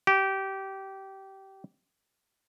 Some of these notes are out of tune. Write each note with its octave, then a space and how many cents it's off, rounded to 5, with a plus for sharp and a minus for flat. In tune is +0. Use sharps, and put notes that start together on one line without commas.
G4 -20